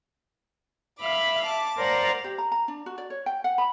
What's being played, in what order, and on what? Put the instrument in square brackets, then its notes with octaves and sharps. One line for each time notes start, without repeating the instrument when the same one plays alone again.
[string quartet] E5 F5 B5 D6
A5 D6
A#4 C5 D5 F5 F#5 A#5
[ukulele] G4
A#5
A#5
D4
F#4
D5
C#5
G5
F#5
B5